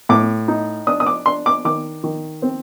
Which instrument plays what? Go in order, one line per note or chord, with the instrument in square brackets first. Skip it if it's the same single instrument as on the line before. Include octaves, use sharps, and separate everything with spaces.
[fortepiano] A2 D6
D#4
D4 D#6
D#6
D6
D4 C6
D6
D#3 D6
D#3
C4